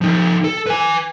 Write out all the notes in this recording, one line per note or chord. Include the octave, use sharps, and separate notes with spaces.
F3 D#4
A4
B4 G#5